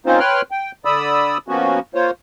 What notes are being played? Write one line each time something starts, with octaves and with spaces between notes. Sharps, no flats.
A#3 C4 C#4 D#4 F4 C5
B4 C#5 G5 C6 F6 F#6
G5
D3 D5 B5 D#6 E6
F3 A#3 B3 C#4 F#4
A#3 F4 C5 C#5